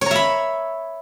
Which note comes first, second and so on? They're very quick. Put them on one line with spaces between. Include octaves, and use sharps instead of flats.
C#5 A#5 E5 B5